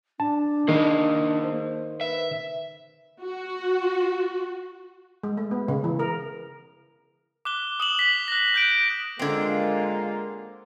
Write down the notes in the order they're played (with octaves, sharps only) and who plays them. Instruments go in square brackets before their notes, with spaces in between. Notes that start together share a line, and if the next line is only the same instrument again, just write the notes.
[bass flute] D4 [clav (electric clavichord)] A5
[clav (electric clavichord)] D#3 [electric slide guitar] A#3 G#4
[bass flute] C5
[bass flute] B4 [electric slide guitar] E5
[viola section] F#4
[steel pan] G#3
A3
B3
C#3
E3
A#4
[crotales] D6 F#6 G7
D#6 E7 F#7
B6
F#6 A#6
F#6 G6 D7
[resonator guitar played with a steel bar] D3 C4 [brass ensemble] G#3 A#3 F4